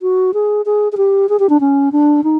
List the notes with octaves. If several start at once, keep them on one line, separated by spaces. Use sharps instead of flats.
F#4
G#4
G#4
G#4
G4
G#4
G4
D4
C#4
D4
D#4